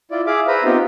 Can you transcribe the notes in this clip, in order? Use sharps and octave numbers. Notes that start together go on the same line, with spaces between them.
E4 F4 D5
G#4 E5 F5 D6
B4 C5 E5 A#5 B5
B3 C4 D#4 F4 G4